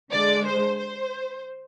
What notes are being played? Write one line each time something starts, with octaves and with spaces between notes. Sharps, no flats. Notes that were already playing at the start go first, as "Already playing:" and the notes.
D3 G#3 D5
C5
C5